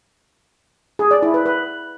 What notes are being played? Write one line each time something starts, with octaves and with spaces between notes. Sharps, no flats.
G#4
D5
E4
B4
B4